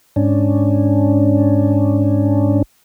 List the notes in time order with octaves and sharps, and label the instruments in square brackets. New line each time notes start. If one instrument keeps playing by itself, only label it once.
[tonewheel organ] G#2 C#4 D4